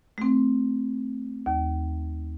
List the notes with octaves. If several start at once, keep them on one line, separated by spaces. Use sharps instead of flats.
A3 C4
D#2